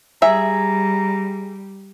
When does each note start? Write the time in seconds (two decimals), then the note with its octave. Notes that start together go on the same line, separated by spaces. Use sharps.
0.22 G3 G#4 E5 A#5